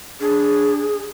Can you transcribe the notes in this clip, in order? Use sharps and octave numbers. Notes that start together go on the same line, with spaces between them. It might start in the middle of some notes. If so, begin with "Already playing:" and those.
D4 G#4